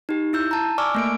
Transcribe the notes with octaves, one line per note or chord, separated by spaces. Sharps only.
D#4 G4
E4 E6 G6
A5 A#5
D5 G#5 C#6 D6 E6 F6
A3 A#3 D7